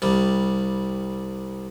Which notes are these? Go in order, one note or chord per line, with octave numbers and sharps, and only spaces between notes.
C2 G3